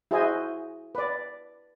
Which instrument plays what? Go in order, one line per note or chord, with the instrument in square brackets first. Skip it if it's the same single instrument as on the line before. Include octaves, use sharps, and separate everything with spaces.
[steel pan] E4 F#4 G#4 C5 D#5 G#5
B4 D5